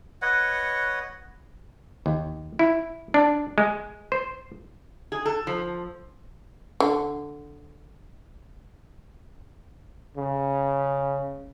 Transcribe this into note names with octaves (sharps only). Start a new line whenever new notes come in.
B4 C#5 D#5 F#5
D#2
E4
D4
G#3
C5
G#4
A4
F3
D3
C#3